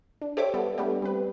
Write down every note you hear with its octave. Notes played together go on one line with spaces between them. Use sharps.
D4
G4 A4 C5 C#5 E5 D6
G3 B3 A4
G3 A3 B3 D4 G4
G3 C4 B4